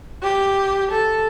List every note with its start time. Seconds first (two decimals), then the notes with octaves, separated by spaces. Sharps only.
0.22 G4
0.91 A4